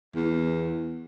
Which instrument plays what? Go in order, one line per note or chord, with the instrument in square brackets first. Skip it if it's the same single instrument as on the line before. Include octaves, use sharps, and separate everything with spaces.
[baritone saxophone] E2